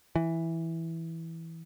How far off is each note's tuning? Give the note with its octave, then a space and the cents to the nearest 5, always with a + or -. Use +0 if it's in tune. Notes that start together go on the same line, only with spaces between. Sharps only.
E3 -5